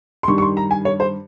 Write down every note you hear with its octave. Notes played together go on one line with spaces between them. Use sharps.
C6
G2 D#3 G3 C#6
C#6
C6
A#5
G#5
C#5
C5